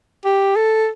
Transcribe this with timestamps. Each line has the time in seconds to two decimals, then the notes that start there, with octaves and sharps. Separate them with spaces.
0.25 G4
0.56 A4